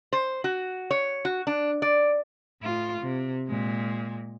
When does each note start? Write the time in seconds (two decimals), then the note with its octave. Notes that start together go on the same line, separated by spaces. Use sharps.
0.13 C5
0.44 F#4
0.91 C#5
1.25 F#4
1.47 D4
1.82 D5
2.62 A2 F4
3.01 C3
3.47 A#2 G#3